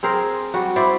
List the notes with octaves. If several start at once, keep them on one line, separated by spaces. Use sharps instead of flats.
C4 G#4 A#4 C5
G3 F#4
E4 C5 D5 E5